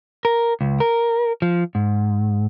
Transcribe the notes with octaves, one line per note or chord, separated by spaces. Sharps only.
A#4
C#2
A#4
F3
G#2